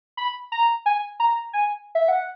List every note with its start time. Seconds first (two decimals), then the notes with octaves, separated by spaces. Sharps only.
0.17 B5
0.52 A#5
0.86 G#5
1.20 A#5
1.53 G#5
1.95 E5
2.08 F#5